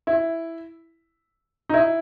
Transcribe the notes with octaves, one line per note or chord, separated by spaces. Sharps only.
E4
D#4
E4